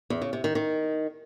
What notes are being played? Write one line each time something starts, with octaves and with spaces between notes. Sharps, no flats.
E2
C#3
C3
D#3
D#3